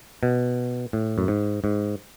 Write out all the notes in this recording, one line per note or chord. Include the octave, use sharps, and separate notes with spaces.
B2
A2
F#2
G#2
G#2